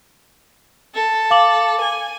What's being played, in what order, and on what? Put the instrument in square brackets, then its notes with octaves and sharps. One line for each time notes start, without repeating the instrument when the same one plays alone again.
[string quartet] A4
[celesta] F5 D6 F#7
[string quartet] G#5